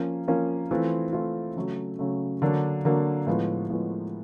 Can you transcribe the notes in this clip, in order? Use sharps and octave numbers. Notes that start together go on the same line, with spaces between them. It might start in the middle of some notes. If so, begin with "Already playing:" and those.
Already playing: F3 A#3 C#4
F3 A#3 C#4
E3 A3 C4 F4
E3 A3 C4 F4
C#3 F#3 A3
C#3 F#3 A3
D3 F#3 A#3 D4
D3 F#3 A#3 D4
A2 F3 G#3 B3
A2 F3 G#3 B3